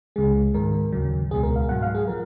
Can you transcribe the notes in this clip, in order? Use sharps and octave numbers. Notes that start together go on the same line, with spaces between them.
C#2 C#3 G#3 G#4
G#2 D#3 G#3 A#4
D#2 C#3 F#3
C#2 B2 G#3 G#4
A#4
F5
G#2 F#3 F#5
F5
G#4
F3 A#4